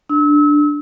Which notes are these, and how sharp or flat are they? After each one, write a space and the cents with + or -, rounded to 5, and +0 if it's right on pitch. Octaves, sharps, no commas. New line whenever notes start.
D4 +0 E6 -35